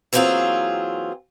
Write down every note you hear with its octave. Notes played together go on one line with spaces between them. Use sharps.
E3 F#3 A#3 C4 F4 G#4